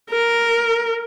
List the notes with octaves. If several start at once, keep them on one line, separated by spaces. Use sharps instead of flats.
A#4